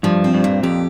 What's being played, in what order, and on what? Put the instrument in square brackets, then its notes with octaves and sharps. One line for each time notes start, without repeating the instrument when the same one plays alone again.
[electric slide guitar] G2 [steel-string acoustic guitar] F3
[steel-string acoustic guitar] C4
[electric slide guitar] G2
[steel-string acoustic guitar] A#2
[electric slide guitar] F2 [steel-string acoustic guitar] G4